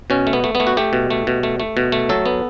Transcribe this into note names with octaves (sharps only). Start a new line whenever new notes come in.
B2 C#4
A3
B3
A3
B3
A3
F#4
A3 G4
B2
A3
B2
A3
A3
B2
A3
F#3 A4
B3